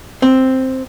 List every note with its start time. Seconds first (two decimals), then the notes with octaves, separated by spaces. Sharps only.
0.22 C4